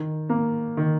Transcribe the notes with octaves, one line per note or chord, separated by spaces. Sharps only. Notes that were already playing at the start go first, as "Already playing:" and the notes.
Already playing: D#3
A#3
D#3